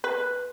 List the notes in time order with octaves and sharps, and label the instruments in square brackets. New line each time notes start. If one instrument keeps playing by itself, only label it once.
[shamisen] B4